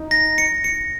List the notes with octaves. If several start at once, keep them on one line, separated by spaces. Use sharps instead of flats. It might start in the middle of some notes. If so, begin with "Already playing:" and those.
Already playing: D#4
A#6
C#7
C#7